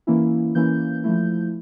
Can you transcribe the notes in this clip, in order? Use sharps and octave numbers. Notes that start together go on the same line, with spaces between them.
E3 A#3 C#4 E4
E3 A#3 C#4 E4 G6
F3 A3 E4